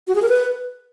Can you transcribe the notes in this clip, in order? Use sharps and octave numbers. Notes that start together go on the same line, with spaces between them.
F#4
G#4
A#4
B4